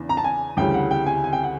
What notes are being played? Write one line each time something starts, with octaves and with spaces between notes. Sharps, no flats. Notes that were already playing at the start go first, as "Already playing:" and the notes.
Already playing: E2 C#3 E3 D4
A#5
A5
G#5
D2 C#3 E3 G3 G5
F#5
G5
G#5
G#5
G5
F#5